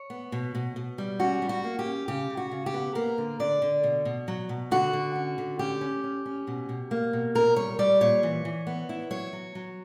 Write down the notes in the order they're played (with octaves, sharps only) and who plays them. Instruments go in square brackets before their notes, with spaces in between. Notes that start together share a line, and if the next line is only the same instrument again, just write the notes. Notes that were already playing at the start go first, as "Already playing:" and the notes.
Already playing: [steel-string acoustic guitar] C#5
B3
B2
B2
B2
G3
C#4 F#4
G3
F#4
A#3
G4
C#4
C#3 G4
C#3
F#4
C#3
G4
B3
A#3 A#4
D3
D3 D5
D3
B2
B2
F#3
B2
D3 F#4
D3
C#4
D3
C#4 G4
C#4
C#4
C#4
B2
B2
A#3
B2
A#2 A#4
G3 C#5
G3 D5
A#2 C#5
E3
E3
B3
E4
F#3 C#5
F#3
F#3